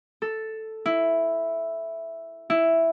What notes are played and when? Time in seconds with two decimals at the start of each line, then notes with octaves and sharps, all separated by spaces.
0.22 A4
0.86 E4
2.50 E4